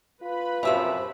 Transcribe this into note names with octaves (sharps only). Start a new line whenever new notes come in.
F4 B4 B5
F#2 C3 F3 E5 E6